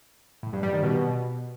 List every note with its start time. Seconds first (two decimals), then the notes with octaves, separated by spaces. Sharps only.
0.43 A2
0.53 G2
0.63 G3
0.73 D#3
0.83 B2